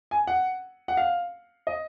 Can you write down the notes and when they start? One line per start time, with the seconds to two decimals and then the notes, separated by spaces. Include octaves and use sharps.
0.11 G#5
0.27 F#5
0.88 F#5
0.97 F5
1.67 D#5